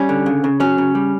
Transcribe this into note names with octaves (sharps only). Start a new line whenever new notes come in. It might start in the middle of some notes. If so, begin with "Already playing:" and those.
Already playing: G3 C#4
D3
C#3
C#3
F#3 C#4
C#3
G3